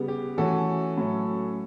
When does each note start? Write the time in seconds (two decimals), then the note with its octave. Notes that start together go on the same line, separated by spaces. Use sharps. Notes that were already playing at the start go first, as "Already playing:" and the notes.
Already playing: C#3 G3 B3
0.08 G4
0.37 E3 A3 C#4 F#4 A4
0.97 A2 F#3 C#4